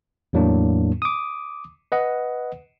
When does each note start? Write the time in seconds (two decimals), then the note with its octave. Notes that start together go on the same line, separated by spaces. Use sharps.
0.33 E2 A2 F#3 A#3 D4
1.02 D6 D#6
1.92 B4 D#5 F#5